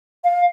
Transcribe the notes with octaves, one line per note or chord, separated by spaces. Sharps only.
F5